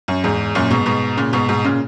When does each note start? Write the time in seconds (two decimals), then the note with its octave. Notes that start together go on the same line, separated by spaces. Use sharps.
0.08 F#2
0.24 E2 G#2
0.55 F#2 A#2
0.70 G#2 B2
0.86 G#2 B2
1.17 A#2 C#3
1.33 G#2 B2
1.49 G#2 B2
1.64 A#2 C#3